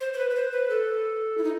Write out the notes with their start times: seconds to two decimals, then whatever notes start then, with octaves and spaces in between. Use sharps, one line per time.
0.01 C5
0.13 C5
0.18 B4
0.30 B4
0.35 C5
0.52 B4
0.70 A4
1.38 E4
1.44 D#4